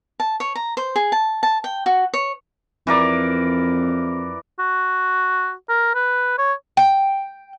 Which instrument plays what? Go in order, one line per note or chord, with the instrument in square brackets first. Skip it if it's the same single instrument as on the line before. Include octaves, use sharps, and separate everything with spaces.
[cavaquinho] A5
C#5
A#5
C5
G#4
A5
A5
G5
F#4
C#5
[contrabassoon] F2 [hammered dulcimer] E3 A#4 D5
[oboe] F#4
A#4
B4
C#5
[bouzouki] G5